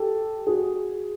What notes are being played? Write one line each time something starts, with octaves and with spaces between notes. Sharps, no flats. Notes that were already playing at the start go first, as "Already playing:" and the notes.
Already playing: G4 A4
F#4 G#4